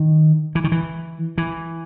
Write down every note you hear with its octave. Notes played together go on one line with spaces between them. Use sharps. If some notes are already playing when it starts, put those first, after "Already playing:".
Already playing: D#3
E3
D#3
E3
E3